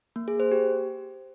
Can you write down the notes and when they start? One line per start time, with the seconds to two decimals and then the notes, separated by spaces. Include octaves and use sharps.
0.16 A#3
0.28 G#4
0.40 C5
0.52 G4